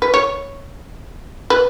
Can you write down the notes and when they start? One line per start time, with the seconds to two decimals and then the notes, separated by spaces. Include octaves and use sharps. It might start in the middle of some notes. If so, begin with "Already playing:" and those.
0.02 B4
0.14 C#5
1.50 B4